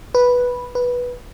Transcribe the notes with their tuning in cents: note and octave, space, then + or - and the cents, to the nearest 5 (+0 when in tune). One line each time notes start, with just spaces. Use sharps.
B4 -5
B4 -10